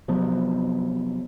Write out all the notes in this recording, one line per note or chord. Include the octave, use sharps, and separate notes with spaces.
C3 F3 F#3 B3